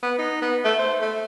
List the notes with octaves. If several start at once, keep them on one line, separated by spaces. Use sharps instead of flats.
B3
D#4
B3
A3
C5
A3